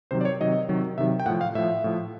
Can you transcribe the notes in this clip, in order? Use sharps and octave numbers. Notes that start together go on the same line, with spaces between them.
C3 D#3 F#3 C5
D5
C#5
C3 D#3 F#3 D#5
C3 D#3 F#3
C3 D#3 F#3 E5
G5
A2 F3 F#5
F5
A2 F3 E5
A2 F3